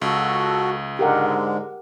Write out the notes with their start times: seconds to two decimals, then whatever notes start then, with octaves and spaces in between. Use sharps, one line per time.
0.02 C#2 F#4 A4
0.99 G#2 D3 G#3 G4 A#4 F#5